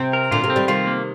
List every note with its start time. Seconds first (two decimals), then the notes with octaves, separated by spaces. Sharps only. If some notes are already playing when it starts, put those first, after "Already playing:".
Already playing: C3 C4
0.13 A#4
0.31 A#2 D3 F4
0.44 C3 D#3
0.50 C4
0.56 D#3 G3
0.68 C3 D#3 F4
0.87 A#3